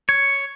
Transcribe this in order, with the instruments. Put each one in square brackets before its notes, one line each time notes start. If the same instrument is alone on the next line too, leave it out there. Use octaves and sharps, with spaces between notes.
[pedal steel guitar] C#5